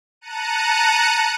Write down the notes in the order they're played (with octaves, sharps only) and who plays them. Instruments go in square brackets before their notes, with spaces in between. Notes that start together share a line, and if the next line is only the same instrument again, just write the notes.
[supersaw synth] A5 A#5 F#6 C#7 D#7